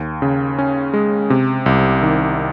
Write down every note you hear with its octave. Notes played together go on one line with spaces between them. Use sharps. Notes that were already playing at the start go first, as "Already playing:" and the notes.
Already playing: D#2
C#3
C#4
G#3
C3
C2
D#3